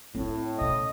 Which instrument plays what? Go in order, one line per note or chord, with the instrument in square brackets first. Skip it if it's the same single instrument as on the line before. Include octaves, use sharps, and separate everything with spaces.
[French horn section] A2 [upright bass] C4 E4
[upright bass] B1 C#3 [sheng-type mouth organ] D#5